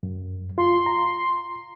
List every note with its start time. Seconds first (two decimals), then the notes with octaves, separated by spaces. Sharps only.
0.03 F#2
0.58 F4 C6
0.86 A#5